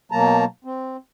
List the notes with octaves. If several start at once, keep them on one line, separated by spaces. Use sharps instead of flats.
B2 F#3 A#3 A5 A#5
C4